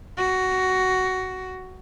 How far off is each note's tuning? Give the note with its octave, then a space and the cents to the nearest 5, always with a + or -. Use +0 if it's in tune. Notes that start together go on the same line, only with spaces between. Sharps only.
F#4 +10